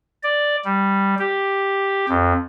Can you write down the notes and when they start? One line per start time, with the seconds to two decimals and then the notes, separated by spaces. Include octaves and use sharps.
0.23 D5
0.64 G3
1.19 G4
2.09 F2